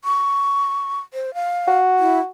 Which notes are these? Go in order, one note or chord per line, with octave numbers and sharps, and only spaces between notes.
C#6
C5
F5
F#4
E4